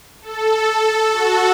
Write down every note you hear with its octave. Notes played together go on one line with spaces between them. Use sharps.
A4
F#4